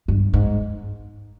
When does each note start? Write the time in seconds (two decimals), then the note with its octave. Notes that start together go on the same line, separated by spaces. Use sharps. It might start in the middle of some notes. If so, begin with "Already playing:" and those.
0.08 G2
0.34 G#2